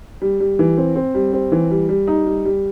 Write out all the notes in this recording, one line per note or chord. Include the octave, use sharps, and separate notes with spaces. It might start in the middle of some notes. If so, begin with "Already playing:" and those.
G3
G3
E3
C4
C4
G3
C4
E3
G3
G3
D#4
G3
G3